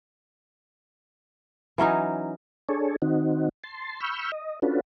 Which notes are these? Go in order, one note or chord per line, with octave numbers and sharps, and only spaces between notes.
E3 F#3 C#4 D#4
D4 G#4 A4 C#5
D#3 C4 D#4 F#4
A5 C6
B5 C#6 E6 F6 G6
D#5
C#4 D4 F4 F#4 A4 B4